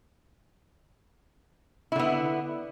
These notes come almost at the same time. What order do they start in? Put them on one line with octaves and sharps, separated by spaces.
E4 D3 B3